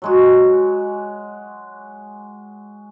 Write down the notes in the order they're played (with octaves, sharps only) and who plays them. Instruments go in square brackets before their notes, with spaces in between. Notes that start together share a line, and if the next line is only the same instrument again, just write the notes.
[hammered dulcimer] F#3 G#3 F#4